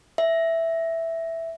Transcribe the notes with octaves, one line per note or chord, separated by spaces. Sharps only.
E5